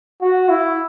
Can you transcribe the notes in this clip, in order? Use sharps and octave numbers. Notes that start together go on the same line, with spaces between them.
F#4
E4